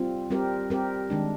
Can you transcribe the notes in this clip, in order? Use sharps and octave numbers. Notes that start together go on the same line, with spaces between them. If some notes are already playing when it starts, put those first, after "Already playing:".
Already playing: G3 C4 F4
G3 C4 G4 A#4
G3 C4 G4 A#4
D#3 G#3 D4